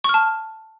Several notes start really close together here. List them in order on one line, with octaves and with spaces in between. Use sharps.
C#6 F6 A5